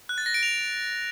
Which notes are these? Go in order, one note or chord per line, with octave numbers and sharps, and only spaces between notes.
F#6
A6
A#6
D7
F7